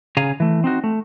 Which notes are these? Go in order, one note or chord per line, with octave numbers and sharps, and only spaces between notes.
C#3 G#4 F5 G#5 A#5
E3 A3
C4 D#4 F#4
A3